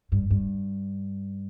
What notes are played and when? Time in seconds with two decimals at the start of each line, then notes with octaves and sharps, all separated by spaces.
0.12 G2
0.31 G2